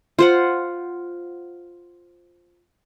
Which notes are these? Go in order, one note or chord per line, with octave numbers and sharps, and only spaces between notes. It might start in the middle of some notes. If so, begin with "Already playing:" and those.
F4 C5 F#5